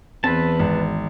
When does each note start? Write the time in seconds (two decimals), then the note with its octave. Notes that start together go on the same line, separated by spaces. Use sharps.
0.24 E2 C4 B4 A5
0.59 G#1